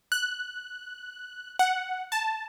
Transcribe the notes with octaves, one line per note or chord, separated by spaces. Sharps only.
F#6
F#5
A5